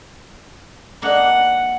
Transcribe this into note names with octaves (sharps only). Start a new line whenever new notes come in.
A#3 D4 D#4 F#5